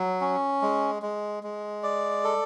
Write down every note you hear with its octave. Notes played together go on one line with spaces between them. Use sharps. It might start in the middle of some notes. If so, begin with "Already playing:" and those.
Already playing: F#3
C#4
G#3
G#3
G#3
D5
A4